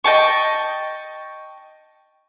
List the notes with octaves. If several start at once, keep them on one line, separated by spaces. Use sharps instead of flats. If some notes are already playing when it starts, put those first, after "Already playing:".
D#5 G5 A5 C#6